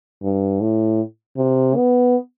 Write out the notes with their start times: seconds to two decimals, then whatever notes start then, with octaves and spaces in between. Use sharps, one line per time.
0.22 G2
0.61 A2
1.37 C3
1.76 B3